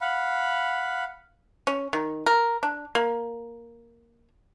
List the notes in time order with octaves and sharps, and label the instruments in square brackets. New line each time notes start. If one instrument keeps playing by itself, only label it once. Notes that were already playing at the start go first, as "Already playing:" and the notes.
[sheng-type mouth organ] F5 F#5 B5
[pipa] C#4
D#3
A#4
D4
A#3